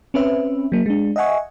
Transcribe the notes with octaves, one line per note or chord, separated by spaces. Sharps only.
C4 C#4 B4 E5
F#3 A#3
G#3 D4
D#5 E5 F#5 G#5 C#6